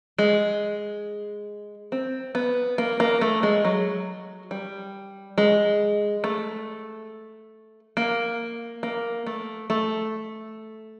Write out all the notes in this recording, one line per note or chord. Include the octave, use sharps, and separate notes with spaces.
G#3
C4
B3
A#3
A#3
A3
G#3
F#3
G3
G#3
A3
A#3
A#3
A3
A3